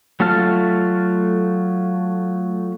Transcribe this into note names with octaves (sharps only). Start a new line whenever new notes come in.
F#3 A3 F4 A5 F6